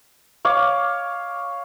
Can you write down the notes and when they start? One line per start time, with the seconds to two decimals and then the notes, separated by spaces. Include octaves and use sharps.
0.45 C#5 F5 D6